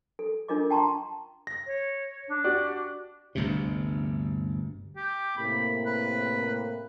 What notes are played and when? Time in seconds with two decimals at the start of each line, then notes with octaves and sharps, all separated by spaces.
0.19 A4
0.48 D4 F4 A#4 D#5 D6
0.70 G5 A5 A#5 C6 C#6
1.47 A#6
1.66 C#5
2.28 D4
2.44 F#4 G4 D5
3.35 G1 D2 G2 C3
4.97 G4
5.37 A2 C3 A#3 B5
5.86 B4